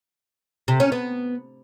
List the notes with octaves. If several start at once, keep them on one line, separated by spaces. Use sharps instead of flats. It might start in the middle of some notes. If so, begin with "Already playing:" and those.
C3
C#4
B3